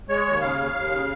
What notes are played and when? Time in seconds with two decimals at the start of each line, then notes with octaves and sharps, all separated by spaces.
0.09 G#3 C#5
0.26 D#2
0.42 C#3 F5
0.58 D#2
0.74 D#2
0.91 C#3